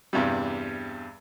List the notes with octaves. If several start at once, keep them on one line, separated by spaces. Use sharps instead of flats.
E2 G2 C3 G3